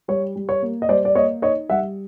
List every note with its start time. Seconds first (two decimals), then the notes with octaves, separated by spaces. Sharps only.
0.08 G3 C#5
0.36 G3
0.49 C#5
0.63 A#3
0.82 D#5
0.89 G3 C5 D5
1.05 D5
1.15 A#3 C#5 D#5
1.42 D#4 C#5 D#5
1.70 G3 E5 F#5